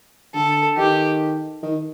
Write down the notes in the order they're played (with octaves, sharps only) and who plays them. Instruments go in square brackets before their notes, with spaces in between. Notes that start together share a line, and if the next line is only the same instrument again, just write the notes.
[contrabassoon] D3 [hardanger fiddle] A4
[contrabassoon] D#3 [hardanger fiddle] G4
[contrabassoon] D#3